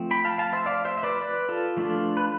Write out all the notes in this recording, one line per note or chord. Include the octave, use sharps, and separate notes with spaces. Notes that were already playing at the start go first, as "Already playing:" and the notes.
Already playing: F3 A3 C4
G5 B5
F5 A5
F5 A5
C5 E5
D5 F5
C5 E5
E5
B4 D5
B4 D5
F4 A4
F3 A3 D4 F4
B4